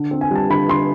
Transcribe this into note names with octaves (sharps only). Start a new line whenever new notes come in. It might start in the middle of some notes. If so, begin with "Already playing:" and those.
Already playing: D3
C4
G#5
G3 A5
D3 B5
D3 C6